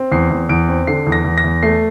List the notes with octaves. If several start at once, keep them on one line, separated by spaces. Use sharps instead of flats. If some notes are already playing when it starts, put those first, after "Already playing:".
Already playing: C4
E2 C7
E2
E2 D7
C4
D3 C7
E2
A#6
E2
A#6
E2
A3 C7